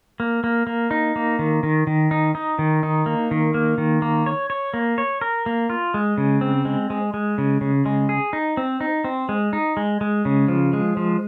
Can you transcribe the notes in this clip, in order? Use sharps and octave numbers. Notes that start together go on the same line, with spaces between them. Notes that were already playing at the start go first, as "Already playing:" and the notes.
A#3
A#3
A#3
D#4
A#3
D#3
D#3
D#3
D#4
D#4
D#3
D#4
A#3
D#3
A#3
D#3
A#3
C#5
C#5
A#3
C#5
A#4
A#3
F4
G#3
C#3
C4
G#3
G#3
G#3
C#3
C#3
G#3
G#4
D#4
C4
D#4
C4
G#3
D#4
G#3
G#3
C#3
F3
G#3
F3